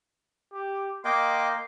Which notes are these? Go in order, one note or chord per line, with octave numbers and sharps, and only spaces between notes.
G4
A#3 D#5 G5 C6 D6